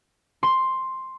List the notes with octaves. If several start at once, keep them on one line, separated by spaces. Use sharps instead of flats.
C6